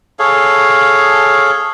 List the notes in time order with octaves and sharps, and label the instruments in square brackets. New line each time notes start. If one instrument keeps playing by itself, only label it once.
[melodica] G#4 A4 C#5 F5